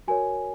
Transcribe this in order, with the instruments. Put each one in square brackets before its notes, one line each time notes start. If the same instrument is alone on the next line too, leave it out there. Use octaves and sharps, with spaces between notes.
[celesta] F#4 A#4 C#5 G#5